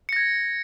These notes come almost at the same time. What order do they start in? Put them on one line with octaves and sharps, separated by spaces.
C#7 A#6 G#6